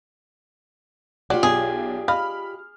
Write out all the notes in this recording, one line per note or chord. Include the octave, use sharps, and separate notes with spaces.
F#3 F4 G4 D5
B1 G#4
D#5 F5 B5 F6